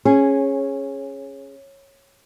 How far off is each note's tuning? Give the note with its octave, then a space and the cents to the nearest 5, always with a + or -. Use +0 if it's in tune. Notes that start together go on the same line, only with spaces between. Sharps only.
C#4 -15 G#4 +0